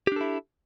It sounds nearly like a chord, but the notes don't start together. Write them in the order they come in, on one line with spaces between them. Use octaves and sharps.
G4 D4 A4 E4